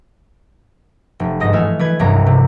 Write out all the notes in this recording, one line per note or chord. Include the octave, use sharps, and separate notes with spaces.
F1
G1 G#2 D#5 A#6
E3 A3 A4 G#5 F6
E3 B4 G#6
F1 C2 G2 C#4 A#5
C3